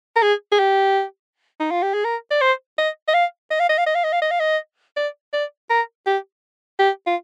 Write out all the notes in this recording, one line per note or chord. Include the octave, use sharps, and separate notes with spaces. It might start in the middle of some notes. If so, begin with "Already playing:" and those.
A#4
G#4
G#4
G4
D#4
F4
G4
G#4
A#4
D5
C5
D#5
D#5
F5
D#5
F5
D#5
F5
D#5
F5
D#5
F5
D#5
F5
D#5
D5
D5
A#4
G4
G4
F4